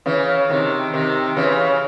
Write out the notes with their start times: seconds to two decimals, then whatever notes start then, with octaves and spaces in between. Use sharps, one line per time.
0.06 C#3 E3
0.50 C3 D#3
0.94 C3 D#3
1.37 C#3 E3